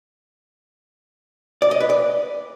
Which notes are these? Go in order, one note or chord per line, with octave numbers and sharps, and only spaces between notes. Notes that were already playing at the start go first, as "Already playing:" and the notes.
D5
D#5
B4
D5